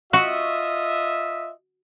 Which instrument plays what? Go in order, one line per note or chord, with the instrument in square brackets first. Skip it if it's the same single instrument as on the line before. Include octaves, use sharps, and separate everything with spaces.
[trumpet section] F4 D#5 E5 [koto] F#4